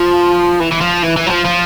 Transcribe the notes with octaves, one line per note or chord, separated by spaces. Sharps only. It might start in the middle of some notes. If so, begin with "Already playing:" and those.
Already playing: F3
E3
E3
F3
E3
E3
F#3
F3
F3